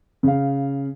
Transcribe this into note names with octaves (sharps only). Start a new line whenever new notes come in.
C#3 F5